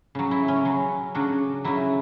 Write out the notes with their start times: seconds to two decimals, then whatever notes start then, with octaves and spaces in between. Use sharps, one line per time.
0.15 C#3 F#3
0.31 E4
0.48 C#4
0.65 C#3 F#3
1.15 C#3 F#3 D4
1.64 C#3 F#3 E4